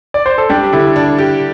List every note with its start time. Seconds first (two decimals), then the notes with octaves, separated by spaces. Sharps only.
0.14 D5
0.26 C5
0.38 A4
0.50 G3 D4 G4
0.73 D3 E4 A4
0.96 D4
1.18 G4